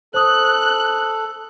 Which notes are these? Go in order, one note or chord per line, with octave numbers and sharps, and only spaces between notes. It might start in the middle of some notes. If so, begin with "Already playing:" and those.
A4 C5 D#6 F#6